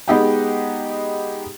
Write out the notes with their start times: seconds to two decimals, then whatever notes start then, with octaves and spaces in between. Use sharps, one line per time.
0.08 G#3 B3 D#4 G4 F#5 G5